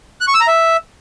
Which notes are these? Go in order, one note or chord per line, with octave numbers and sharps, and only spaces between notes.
F#6
C#6
E6
A#5
E5